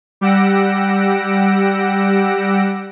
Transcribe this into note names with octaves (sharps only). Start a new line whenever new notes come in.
G3 G4 F#5 E6 A#6 D7